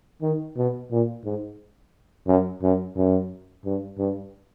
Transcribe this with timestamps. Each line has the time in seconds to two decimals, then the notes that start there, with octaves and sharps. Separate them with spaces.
0.22 D#3
0.57 B2
0.91 A#2
1.25 G#2
2.27 F#2
2.62 F#2
2.96 F#2
3.65 G2
3.98 G2